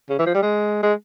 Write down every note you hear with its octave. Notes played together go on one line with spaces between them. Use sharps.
C#3
E3
F3
G3
G#3
G#3